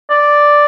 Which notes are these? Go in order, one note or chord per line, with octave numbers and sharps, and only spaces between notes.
D5